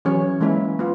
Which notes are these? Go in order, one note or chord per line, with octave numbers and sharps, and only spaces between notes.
E3 F#3 C#4 C#5
E3 G#3 A#3 C#4 E4
B3 F4